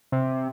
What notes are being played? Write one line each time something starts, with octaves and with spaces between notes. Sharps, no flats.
C3